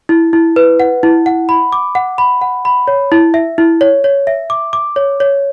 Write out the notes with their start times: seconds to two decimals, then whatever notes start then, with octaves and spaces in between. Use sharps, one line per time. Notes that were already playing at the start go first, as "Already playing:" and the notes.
0.09 E4
0.33 E4
0.56 B4
0.80 F#5
1.03 E4
1.26 F#5
1.49 B5
1.72 D6
1.95 F#5
2.18 B5
2.41 F#5
2.65 B5
2.88 C#5
3.12 E4
3.34 E5
3.58 E4
3.81 C#5
4.04 C#5
4.27 E5
4.50 D6
4.73 D6
4.96 C#5
5.20 C#5